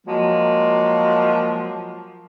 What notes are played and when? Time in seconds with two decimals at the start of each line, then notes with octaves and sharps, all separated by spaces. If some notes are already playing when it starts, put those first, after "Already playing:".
0.07 F3 F#3 G#3 A#3